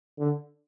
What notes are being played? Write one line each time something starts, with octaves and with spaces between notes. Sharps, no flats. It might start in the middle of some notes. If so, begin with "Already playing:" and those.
D3